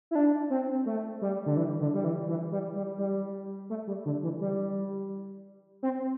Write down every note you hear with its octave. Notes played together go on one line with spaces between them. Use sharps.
E4
D4
C4
A3
G3
D3
E3
D3
G3
E3
E3
G3
G3
G3
A3
G3
D3
E3
G3
C4